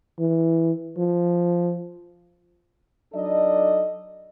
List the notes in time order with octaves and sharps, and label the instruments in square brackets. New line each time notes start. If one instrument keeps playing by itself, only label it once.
[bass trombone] E3
F3
[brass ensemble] F#3 D4 D#4 A4 D5 D#5